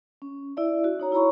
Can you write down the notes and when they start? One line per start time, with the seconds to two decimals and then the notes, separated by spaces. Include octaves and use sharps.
0.22 C#4
0.57 E4 D5 E5
0.84 F#4
1.00 D#4 C#5 A#5
1.12 E4 F#4 C#5 A#5 B5 C#6